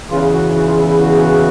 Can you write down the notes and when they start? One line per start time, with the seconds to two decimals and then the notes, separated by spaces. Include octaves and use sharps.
0.10 E2 C#3 E3 F4
0.33 F#4
0.55 F#4
0.67 F4
0.78 E4
0.89 E4
1.01 F#4